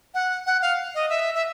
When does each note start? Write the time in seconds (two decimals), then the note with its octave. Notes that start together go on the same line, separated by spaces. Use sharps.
0.14 F#5
0.46 F#5
0.62 F5
0.95 D#5
1.10 E5
1.35 E5